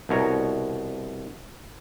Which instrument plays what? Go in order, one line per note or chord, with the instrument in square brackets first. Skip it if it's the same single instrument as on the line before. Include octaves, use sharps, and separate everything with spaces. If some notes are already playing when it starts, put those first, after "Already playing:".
[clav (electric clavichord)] C2 B2 C#5 A#5